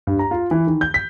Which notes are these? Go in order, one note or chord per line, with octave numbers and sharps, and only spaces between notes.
G2
A#5
F4
E3
D#3
G6
B6